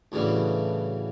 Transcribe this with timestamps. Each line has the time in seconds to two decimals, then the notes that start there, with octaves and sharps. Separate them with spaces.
0.12 D2 A2 C#3 E3 G3